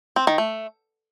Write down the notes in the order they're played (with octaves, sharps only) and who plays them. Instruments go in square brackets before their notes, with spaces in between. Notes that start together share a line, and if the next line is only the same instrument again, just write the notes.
[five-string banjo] C4
D#3
A3